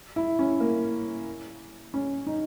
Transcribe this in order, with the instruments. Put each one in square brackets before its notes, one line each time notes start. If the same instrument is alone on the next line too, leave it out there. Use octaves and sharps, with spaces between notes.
[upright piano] E4
C#4
A#3
C#4
D#4